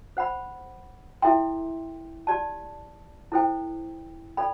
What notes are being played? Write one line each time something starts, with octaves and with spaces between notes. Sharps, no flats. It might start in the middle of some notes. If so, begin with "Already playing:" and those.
C5 F#5 B5
E4 A4 E5 G5 C6
G4 D5 A5
E4 A4 C5 G5
A4 D5 G5 B5